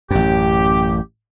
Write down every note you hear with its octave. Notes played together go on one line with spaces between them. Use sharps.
A1 F#2 G4